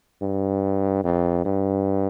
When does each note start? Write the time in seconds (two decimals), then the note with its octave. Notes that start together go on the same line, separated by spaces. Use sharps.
0.22 G2
1.04 F2
1.45 G2